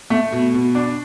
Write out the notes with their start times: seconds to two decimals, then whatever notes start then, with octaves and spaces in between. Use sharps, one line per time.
0.10 A3
0.32 B2
0.54 B2
0.75 D4